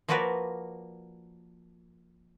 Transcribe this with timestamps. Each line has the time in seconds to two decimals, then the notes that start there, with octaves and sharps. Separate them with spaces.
0.08 F3 A#3 F#4 A#4 B4 D5